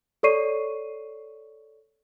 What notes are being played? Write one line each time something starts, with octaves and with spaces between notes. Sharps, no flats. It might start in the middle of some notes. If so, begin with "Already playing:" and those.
A4 C#5 D5 C#6 C7 D#7